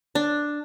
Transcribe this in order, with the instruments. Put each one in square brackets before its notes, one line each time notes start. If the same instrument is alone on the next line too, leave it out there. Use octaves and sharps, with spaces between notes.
[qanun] D4